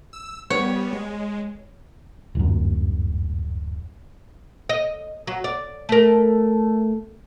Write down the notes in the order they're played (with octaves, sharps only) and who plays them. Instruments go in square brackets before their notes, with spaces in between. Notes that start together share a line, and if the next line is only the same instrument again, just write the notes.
[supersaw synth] E6
[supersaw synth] G3 B3 [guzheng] C#5
[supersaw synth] G#3
[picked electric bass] D1 G1 F#2
[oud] D#5
F#3
D5
A3 A#4